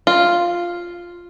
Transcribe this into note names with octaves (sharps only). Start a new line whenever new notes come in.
F4